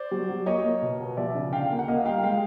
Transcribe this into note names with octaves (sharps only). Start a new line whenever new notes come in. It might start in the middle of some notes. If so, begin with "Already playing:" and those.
Already playing: C5 D5
F#3
F#3
A#3 C#5 D#5
A#3
B2
B2
F3 D5 E5
C#3
D3 F5 G5
A#3
F#5
A#3 D#5 F5
G3 F5 G5
G#3 F5 G5